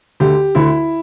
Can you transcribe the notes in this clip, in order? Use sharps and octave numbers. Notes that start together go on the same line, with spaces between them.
D2 D3 G4
D2 D3 E4